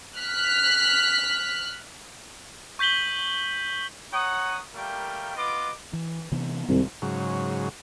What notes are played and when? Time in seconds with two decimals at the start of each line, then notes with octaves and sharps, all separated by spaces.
0.17 F6 F#6 B6
2.79 C#6 G6 B6 F#7 G7
4.13 C#5 F#5 A#5 D#6
4.74 G3 A3 A#3 A#4 F5 G5
5.36 B3 F4 B4 D#5 D6
5.93 E3
6.32 C3 E3 B3
6.69 D1 C2 G#2 D#3
7.02 G#2 C#3 F#3